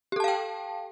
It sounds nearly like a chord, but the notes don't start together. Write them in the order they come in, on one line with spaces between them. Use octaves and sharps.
G4 A4 A5 F5 G5